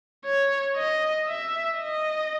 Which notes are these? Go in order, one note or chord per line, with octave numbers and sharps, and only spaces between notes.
C#5
D#5
E5
D#5